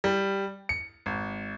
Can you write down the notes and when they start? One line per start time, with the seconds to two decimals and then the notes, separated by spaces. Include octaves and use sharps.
0.04 G3
0.69 C#7
1.06 G#1